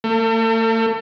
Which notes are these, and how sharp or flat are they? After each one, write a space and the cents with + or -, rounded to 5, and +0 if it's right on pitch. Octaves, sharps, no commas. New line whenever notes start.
A3 +45